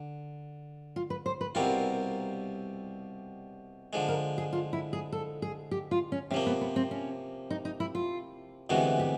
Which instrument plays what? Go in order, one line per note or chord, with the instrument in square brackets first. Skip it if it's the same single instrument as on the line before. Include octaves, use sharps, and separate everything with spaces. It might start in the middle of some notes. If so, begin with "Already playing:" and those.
Already playing: [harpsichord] D3
[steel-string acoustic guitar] F4
B4
C5
B4
[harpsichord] C2 B2 G3 C4 F4 [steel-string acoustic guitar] A#4
[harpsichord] D3 F3 G#3
[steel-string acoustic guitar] A#4
G#4
F4
E4
G#4
A4
G#4
G4
F4
C#4
[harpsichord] C3 [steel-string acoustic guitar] C#4
[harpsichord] F3 A#3
[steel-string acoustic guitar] B3
B3
C4
C#4
D#4
D#4
E4
F4
[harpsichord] D2 C3 E3 G#3 B3 [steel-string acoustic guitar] F#4
[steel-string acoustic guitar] G4